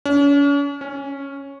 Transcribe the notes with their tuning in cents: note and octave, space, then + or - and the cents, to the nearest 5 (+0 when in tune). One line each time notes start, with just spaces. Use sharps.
C#4 +40
C#4 -5